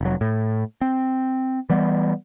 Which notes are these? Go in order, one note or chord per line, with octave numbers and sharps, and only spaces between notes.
F1 F#3
A2
C4
E3 G3 B3